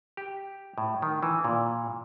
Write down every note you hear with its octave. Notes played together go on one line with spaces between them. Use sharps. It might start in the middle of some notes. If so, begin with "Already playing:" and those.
G4
A2
D#3
E3
A#2